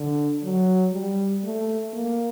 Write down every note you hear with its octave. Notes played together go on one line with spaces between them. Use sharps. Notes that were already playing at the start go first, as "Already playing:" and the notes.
Already playing: D3
F#3
G3
A3
A#3